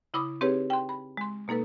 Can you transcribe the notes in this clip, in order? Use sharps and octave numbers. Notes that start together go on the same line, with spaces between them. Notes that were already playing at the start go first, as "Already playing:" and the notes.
C#3 E4 B5 D6 D#6
C4 D#4 G4 G#4 B4 C#5
G5 C6
B5
G#3 C6
B2 A#3 D#4 A4 B4